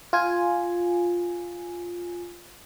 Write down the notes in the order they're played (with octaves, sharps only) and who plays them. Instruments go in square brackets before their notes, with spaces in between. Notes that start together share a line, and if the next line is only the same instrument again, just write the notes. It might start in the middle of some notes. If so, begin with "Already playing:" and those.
[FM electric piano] F4 G#5